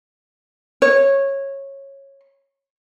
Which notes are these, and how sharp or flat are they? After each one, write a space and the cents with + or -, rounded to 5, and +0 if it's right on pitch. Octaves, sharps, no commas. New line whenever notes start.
C#5 -15